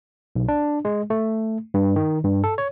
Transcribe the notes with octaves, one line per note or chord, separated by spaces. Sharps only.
B1
D4
G#3
A3
G2
D#3
G2
A4
C#5